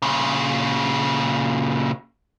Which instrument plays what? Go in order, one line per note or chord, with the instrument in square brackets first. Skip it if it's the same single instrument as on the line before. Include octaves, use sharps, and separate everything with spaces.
[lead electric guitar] A#2 C#3